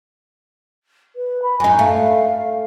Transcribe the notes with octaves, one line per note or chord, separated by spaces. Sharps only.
B4
B5
F#2 D#4 G#5
A3 F5